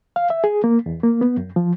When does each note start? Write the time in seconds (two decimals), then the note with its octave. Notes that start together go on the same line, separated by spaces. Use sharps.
0.16 F5
0.30 E5
0.44 G#4
0.64 A#3
0.86 E2
1.03 A#3
1.21 B3
1.37 F#2
1.56 F3